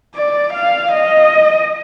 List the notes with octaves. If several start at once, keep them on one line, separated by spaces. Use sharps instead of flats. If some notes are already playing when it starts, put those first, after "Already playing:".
D5
F5
D#5